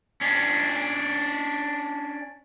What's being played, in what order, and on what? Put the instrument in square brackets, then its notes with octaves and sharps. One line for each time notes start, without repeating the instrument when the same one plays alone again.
[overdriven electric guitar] C#4 D4